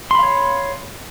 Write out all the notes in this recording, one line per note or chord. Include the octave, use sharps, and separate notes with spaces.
C#5 F5 B5 C6